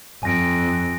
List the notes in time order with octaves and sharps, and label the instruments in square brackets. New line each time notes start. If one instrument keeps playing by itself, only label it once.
[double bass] F2 [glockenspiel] G#5 A#6 D7